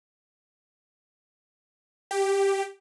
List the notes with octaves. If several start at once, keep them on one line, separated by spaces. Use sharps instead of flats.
G4